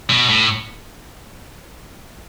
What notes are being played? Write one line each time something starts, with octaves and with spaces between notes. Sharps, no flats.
B2
A2